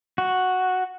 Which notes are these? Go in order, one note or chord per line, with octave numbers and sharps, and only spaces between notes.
F#4